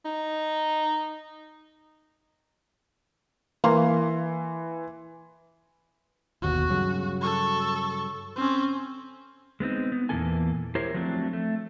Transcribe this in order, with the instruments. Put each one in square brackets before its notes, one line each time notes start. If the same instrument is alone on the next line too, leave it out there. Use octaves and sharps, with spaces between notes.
[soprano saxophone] D#4
[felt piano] E3 C6 [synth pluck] A#3
[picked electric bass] G1 D#2 B2 [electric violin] F#4
[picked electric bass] G2 C#3 F#3
[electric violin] A4 C#6
C4 C#4
[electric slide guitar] G#3 B3 C4 D#4
B3
E2 A#2 E3 A#3 A4 G#5
E4 G4 A#4 C5 C#5
F3 F#3 A3 C4 D4
A3